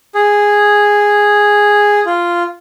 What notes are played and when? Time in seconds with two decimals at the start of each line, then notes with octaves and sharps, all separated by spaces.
0.15 G#4
2.06 F4